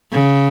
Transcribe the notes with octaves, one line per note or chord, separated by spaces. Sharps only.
C#3